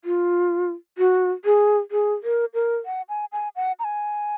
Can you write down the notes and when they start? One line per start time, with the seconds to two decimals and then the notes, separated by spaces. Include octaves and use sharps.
0.05 F4
0.98 F#4
1.45 G#4
1.91 G#4
2.23 A#4
2.54 A#4
2.86 F#5
3.09 G#5
3.32 G#5
3.56 F#5
3.79 A#5
3.84 G#5